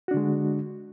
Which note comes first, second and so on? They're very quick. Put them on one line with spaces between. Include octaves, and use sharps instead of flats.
F#4 D4 D3 G#3